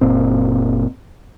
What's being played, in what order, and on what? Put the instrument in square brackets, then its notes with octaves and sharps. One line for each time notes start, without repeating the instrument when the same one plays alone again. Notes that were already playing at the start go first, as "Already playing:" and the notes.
[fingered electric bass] F#1 A#2 C4